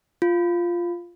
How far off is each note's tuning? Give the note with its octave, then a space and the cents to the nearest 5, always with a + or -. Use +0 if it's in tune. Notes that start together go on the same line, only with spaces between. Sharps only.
F4 -5